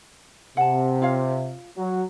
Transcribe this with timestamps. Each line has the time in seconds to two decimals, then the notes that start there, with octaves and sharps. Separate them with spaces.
0.57 C3 F#5 A5
1.02 F4 C#5 F5
1.78 F#3